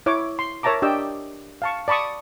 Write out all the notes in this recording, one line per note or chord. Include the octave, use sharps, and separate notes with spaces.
E4 C#5 D6
C6
A#4 C#5 E5 A5 A#5 D6
D4 G4 D5 D#5 G5 E6
F5 A5 C#6
D5 A5 B5 C#6 D#6